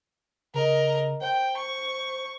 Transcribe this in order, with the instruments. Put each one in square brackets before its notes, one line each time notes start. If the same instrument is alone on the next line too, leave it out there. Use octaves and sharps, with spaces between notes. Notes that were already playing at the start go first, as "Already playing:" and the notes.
[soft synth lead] C#3 [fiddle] A#4 D#5
[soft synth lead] C5 [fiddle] G5
[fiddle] C#6